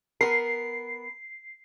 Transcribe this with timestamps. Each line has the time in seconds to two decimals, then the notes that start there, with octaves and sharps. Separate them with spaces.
0.21 B3 A#4 C7